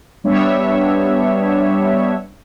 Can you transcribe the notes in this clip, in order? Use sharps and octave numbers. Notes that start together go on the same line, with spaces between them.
G3 B3 D4 C#5 E5